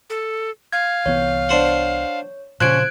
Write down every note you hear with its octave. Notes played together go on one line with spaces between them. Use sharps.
A4
F5 G#6
C2 E3 B3 C#5
D4 C5 F#5
A#2 C#3 F3 C#4 F#6 G#6 D7